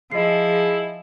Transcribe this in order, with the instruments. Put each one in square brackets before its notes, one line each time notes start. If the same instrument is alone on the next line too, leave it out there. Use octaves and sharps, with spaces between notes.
[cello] F3 [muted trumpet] E4 [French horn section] G#4 [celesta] D#5 C7